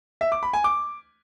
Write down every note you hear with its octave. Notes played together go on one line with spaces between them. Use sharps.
E5
D6
B5
G#5
D6